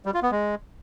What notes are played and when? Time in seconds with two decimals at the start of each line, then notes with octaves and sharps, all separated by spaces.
0.06 G3
0.14 F4
0.23 B3
0.31 G#3